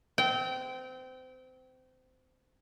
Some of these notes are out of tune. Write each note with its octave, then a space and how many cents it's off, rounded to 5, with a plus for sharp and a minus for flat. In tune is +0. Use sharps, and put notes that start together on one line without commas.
C4 -25 G5 -25